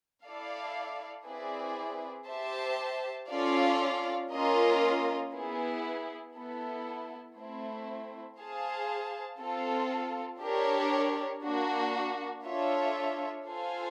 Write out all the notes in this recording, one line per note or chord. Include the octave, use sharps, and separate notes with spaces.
E4 A4 D5 F5
C4 E4 G#4 B4 D5
G4 C5 E5 A5
C#4 F4 A4 D5 F5
A#3 C#4 F4 A#4 D#5
B3 E4 G#4
B3 E4 A4
A3 C4 E4
G#4 C5 F5 A5
C4 F4 A4
D4 G4 A#4 C#5
A#3 D4 F#4
D4 F4 A4 C#5 E5
F4 A4 C5 F5 G#5